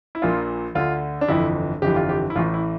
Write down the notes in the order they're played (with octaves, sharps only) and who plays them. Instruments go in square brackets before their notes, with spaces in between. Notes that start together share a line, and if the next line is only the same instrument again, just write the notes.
[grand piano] E4
A#1 A#2 F4
D2 D3 F4
D4
G1 F2 E3 E4
G1 F2 E3 G4
F4
G4
E4
A1 A2 E3 F4
E4